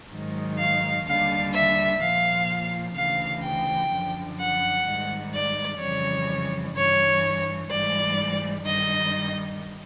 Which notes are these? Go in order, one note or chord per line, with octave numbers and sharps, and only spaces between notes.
G#2 D#3 F#3
F5
D#2 D3 G3 F5
E5
A#2 F3 F5
D2 C#3 E3 F5
G5
F#2 D3 F3
F#5
G#2 D#3 G3
D5
F2 C#3 E3 G3 C#5
G2 E3 G3 C#5
G#2 E3 G3 D5
G2 D#3 G3 D#5